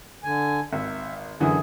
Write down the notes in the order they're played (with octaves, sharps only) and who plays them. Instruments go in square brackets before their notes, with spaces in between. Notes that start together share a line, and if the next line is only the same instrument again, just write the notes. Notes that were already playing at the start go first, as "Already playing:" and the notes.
[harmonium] D3 G#5
[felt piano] G#1 [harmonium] E5
[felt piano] F#2 D3 E3 [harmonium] G#4